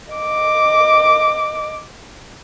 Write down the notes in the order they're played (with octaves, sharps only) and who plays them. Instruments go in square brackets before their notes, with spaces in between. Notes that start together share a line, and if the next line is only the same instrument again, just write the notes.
[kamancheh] D#5 D6